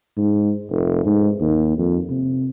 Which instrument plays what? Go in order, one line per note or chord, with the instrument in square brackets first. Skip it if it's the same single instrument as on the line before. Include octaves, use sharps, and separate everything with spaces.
[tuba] G#2
F1
G#2
D#2
F2
C3